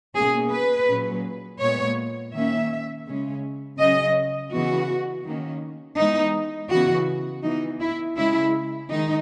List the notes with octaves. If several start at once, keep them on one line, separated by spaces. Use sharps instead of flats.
B2 A#3 C#4 G#4
B4
A#2 F#3 C#4
A#2 G#3 B3 C#5
D#3 A#3 C#4 E5
C#3 G#3 C#4
C#3 F#3 C#4 D#5
C#3 E3 B3 F#4
D#3 A#3 C#4
E3 G#3 B3 D#4
C#3 E3 B3 F#4
E3 B3 D#4
E4
C#3 G#3 C#4 E4
D#3 G#3 D#4